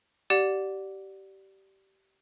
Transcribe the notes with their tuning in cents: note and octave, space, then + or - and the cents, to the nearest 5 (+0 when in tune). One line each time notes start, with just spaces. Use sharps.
G4 -20 D5 +0 F#5 -15